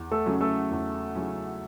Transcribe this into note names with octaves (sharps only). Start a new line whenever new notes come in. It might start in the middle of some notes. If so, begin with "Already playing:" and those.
Already playing: E2
A3 A4
C#3 F#3 C#4
A3 A4
E2
C#3 F#3 C#4